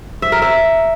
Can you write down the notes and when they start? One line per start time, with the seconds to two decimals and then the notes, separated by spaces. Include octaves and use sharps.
0.22 E5
0.32 A#4
0.42 E5